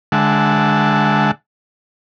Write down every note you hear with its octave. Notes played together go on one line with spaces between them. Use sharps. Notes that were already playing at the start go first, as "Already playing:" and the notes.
D3 G#3 E5 F#5 A5